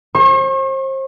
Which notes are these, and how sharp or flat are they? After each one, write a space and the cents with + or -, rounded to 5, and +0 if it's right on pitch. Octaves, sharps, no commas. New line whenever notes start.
C5 +35 C#6 -40